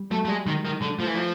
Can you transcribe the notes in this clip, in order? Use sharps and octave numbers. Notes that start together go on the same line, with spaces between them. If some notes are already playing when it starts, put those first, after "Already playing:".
Already playing: G3
F#3 A3
A3
G3 G#3
D#3 G#3
D#3
D3
F3 A3
E3
F3